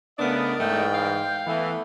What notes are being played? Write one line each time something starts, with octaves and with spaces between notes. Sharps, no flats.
C#3 A3 B3 D4 A#4 D5 D#5
G#2 E3 A3 G5
F5
E3 A3 B3